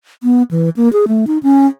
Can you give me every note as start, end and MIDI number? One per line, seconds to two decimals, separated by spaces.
0.23 0.43 59
0.51 0.69 52
0.76 0.91 58
0.93 1.05 68
1.08 1.25 57
1.27 1.38 63
1.43 1.67 61